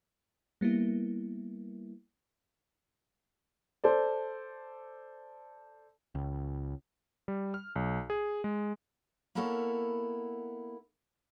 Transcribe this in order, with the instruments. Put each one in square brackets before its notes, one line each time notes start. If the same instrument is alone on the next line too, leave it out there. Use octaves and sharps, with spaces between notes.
[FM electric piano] G3 A#3 B3 E4
[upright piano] A4 C5 D5
[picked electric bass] C#2
[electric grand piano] G3
F6
B1
G#4
G#3
[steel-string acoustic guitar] A#3 B3 E4 A4 A#4 C#5